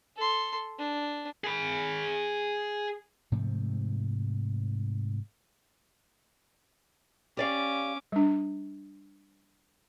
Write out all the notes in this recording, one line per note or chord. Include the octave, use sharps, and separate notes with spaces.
A4 C6
D4
G#4 B5
G#2 C3 F3 A3
C#4 G4 D5 F5 D6
G3 D4